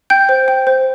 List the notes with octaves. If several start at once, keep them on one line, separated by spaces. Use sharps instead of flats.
G5 G6
C5
G5
C5